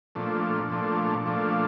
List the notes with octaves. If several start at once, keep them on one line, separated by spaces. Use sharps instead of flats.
A#2 F3 A3 D4
A#2 F3 A3 D4
A#2 F3 A3 D4